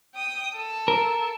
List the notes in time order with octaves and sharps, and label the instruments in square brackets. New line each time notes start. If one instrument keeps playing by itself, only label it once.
[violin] G5 D#6
A4
[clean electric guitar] A#4